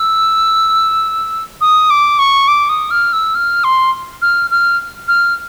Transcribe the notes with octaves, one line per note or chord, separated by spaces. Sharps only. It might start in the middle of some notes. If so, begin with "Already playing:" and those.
Already playing: E6
D#6
D6
C#6
D6
D#6
F6
E6
F6
C6
F6
F6
F6